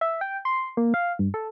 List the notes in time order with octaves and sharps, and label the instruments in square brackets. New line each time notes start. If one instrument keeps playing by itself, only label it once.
[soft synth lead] E5
G5
C6
A#3
F5
G2
A4